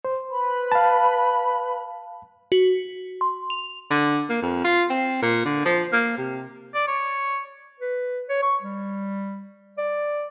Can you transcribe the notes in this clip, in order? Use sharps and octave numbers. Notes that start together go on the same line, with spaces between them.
C5
B4 B5
F5 A5
F#4
C6
F7
D3
A#3
F2
F4
C4
A#2
D3
F3
A#3
C3
D5
C#5
B4
C#5
C#6
G3
D5